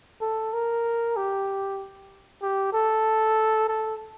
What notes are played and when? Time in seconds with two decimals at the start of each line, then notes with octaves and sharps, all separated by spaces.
0.21 A4
0.53 A#4
1.17 G4
2.43 G4
2.73 A4
3.69 A4